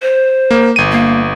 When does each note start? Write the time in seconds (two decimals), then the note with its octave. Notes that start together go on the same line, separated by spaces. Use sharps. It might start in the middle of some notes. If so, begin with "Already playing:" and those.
0.02 C5
0.51 A#3
0.76 G1 D#7
0.92 A#3